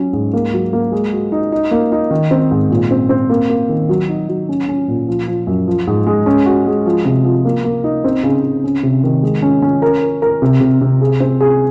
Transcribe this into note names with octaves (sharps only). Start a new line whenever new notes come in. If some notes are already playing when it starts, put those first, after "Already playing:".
Already playing: F#3 C#4
G#2
A#3
F#3
A#3
G#3
F#4
D#4
D#4
A#3
D#4
D#3
C4
G#2
A#2
C4
C4
A#3
A#3
D#3
F#3
D#4
F#3
C#4
C#4
A#2
F3
F3
F#2
F3
G#2
G#3
C#4
F#4
G#3
F3
C3
F3
A#3
A#3
D#4
C4
C#3
C#3
C#4
C3
D#3
G#3
C#4
C#4
A#4
A#4
A#4
C3
C3
C3
G#4
C4
G#4